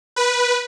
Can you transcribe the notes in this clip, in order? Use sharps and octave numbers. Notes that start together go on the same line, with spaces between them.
B4